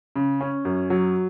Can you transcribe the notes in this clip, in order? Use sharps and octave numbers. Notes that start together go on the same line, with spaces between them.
C#3
C#4
F#2
F#3